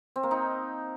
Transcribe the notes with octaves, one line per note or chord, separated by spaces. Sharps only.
C4
A#3
D#4